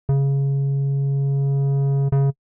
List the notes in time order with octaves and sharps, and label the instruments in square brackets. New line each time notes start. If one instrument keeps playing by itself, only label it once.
[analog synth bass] C#3
C#3